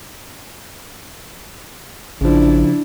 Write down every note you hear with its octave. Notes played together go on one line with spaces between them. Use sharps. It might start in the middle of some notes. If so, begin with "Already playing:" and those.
A1 C#3 F3 D4 E4